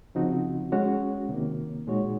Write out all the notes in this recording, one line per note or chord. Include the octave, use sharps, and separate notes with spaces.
C#3 F3 C4 D#4 F#4
G#3 C#4 F#4 C#5
C3 D#3 A#3
A#2 G#3 D#4 F#4 C#5